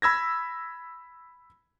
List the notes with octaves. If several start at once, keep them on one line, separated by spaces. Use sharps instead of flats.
B5 E6 G#6 A#6